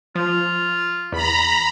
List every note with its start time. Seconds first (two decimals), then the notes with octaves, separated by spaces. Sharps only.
0.15 F3 F4
1.12 E2 A#5 B5